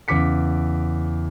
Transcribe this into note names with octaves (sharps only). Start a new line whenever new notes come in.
E2 C#3 D6 B6 C#7